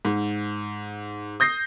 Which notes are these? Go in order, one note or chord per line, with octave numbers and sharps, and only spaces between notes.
G#2
D#6 G6 A#6 C7